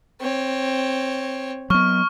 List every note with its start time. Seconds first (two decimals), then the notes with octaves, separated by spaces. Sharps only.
0.21 C4 C#5
1.70 F#3 B3 C#6 F6